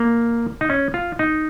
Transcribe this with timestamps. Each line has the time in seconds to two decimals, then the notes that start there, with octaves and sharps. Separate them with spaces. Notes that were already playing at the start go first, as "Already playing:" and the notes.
Already playing: A#3
0.61 D#4
0.70 C#4
0.94 F4
1.19 D#4